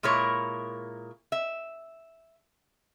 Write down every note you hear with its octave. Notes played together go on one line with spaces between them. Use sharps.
A#2 G#3 E4 A#4 C#5
E5